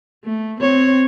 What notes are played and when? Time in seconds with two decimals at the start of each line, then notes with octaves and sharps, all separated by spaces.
0.25 A3
0.60 C4 C#5